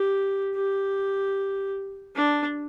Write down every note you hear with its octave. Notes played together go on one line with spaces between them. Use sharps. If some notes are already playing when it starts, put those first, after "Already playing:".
Already playing: G4
G4
D4